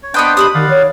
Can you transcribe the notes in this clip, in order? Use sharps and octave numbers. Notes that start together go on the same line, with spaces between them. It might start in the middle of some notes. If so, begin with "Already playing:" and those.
C#5
B3 D4 B4 C5 D#5 G5
G4 B5 D6 D#6
D#3 D5 F5 F#5
C#5